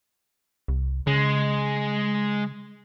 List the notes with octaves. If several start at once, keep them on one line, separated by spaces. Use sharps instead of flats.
C2
C#3 G#3